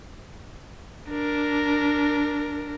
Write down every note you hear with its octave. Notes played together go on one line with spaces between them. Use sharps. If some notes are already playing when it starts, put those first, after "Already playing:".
D4 A#4